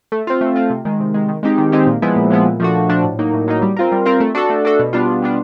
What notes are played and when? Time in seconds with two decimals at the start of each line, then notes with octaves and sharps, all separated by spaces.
0.12 A3
0.27 C4 F4
0.41 A3
0.56 C4 F4
0.70 C3
0.85 D#3 G#3
1.00 C3
1.14 D#3 G#3
1.28 D#3
1.43 G#3 C4 D#4 G4
1.58 D#3
1.72 G#3 C4 D#4 G4
1.87 A#2
2.02 F3 G#3 B3 E4
2.16 A#2
2.30 F3 G#3 B3 E4
2.46 A#2
2.60 F3 A3 D4 F#4
2.75 A#2
2.89 F3 A3 D4 F#4
3.04 A2
3.19 F#3 A#3 D#4
3.34 A2
3.48 F#3 A#3 D#4
3.62 G3
3.76 C4 F4 A#4
3.92 G3
4.06 C4 F4 A#4
4.20 A3
4.35 D4 F#4 A4
4.50 A3
4.65 D4 F#4 A4
4.79 B2
4.93 G3 B3 D4 F4
5.08 B2
5.22 G3 B3 D4 F4